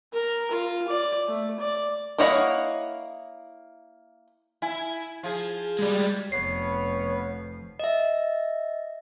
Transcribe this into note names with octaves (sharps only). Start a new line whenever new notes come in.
A#4
F4
D5
A3
D5
A#3 E4 C#5 D#5 F#5
E4 G#5
F3 G#4
G3 G#3
F1 F3 B3 B4 C#5 C7
D#5 E5